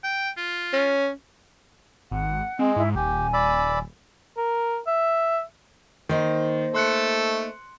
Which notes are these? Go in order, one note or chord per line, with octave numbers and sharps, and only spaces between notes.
G5
F4
C#4
G#1 F#5
G#3 C4
G#2 E4
D#1 G4 G#5
D5 B5 E6
A#4
E5
D#3 A#3 D#4 C5
A3 A4 C6 F#6 C#7